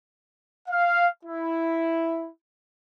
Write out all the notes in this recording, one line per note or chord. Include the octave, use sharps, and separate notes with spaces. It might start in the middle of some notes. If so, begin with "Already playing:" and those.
F5
E4